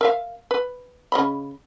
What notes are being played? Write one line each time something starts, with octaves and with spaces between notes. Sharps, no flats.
A#4 E5 F5
B4
C#3 D#5 B5